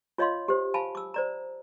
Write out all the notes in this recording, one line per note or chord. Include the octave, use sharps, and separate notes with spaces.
F4 C#5 D#5 F5 C6
G4 C5
F5 G#5 A5 B5
D6 E6
C5 D5 A#5